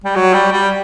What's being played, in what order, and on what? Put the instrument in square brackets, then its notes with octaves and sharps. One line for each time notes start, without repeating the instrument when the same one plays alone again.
[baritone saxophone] G3
F#3
G3
G3